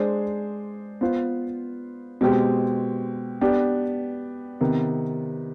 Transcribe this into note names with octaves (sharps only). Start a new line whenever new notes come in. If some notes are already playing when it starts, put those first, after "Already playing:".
Already playing: G#3 D4 G#4 C5
B3 F4 C5
B2 G#3 C4 G4
B3 D4 G4
C3 D#3 B3